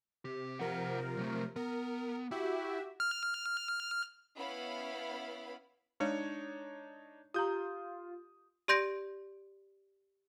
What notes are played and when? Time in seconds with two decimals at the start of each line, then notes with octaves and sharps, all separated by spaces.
0.25 C3 G4
0.59 C3 F3 A#4 C5 F#5
1.17 F#3 A3
1.56 B3 A#4
2.31 E4 F#4 G4 E5
3.00 F6
4.37 B3 C#4 E4 B4 F5 B5
6.00 G#3 D4 D#4 C#5
7.34 F4 G4 A#5 D#6 G6
8.68 G4 D5 C6 G6 A#6 D7